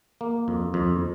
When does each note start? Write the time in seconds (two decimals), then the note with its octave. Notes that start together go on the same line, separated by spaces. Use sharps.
0.21 A#3
0.48 F2
0.74 F2